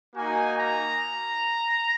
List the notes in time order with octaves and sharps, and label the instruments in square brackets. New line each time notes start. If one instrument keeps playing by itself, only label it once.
[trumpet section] A#3 D#4 F#4 G#5
A#5